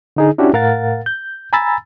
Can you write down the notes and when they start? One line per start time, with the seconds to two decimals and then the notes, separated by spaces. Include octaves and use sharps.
0.16 D3 D#4 G#4
0.38 C#4 D4 E4 F#4 G4
0.53 A2 A#4 F5 F#5 A6
1.06 G6
1.53 G#5 A#5 B5 E6 A6